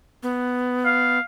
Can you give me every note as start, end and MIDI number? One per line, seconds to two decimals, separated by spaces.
0.23 1.19 59
0.85 1.20 77